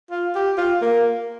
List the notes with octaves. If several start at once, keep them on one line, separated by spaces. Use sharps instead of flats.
F4
G4
F4
A#3